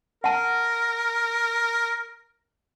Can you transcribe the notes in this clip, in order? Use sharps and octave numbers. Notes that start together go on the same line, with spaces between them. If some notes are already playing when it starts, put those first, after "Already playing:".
A#4 F#5 A5